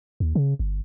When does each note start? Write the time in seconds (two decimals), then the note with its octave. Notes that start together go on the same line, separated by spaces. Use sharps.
0.20 D#2
0.35 C#3
0.59 G1